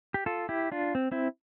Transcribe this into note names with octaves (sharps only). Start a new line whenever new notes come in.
G4
F4 A4
E4 G4
D4 F4
C4
C4 E4